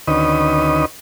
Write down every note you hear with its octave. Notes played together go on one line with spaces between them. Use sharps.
D2 D#3 C#4 D#4 B4 D#6